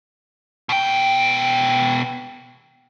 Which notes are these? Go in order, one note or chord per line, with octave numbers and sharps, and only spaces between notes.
B2 G5